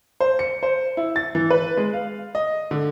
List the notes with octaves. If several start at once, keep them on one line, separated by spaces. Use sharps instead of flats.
C5
C#7
C5
E4
A6
E3
B4
G#3
F5
D#5
D3